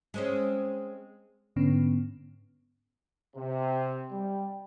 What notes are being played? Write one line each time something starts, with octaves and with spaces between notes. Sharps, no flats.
G#3 C4 C#4
G#2 D3 B3 C#4
C3
G3